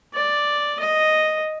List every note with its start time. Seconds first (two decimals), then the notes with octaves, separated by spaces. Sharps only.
0.14 D5
0.80 D#5